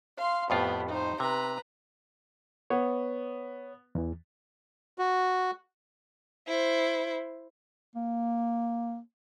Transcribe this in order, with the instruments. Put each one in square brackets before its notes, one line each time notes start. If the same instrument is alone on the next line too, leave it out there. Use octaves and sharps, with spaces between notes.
[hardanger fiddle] F5 C6
[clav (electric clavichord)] F2 A2 F4 [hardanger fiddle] B3 G4
[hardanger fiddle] D#4 C5
[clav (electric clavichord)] C3 [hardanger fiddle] B4 A#5
[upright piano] B3 [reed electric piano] C#5
[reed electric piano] E2 E3
[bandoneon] F#4
[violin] E4 C5
[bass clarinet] A#3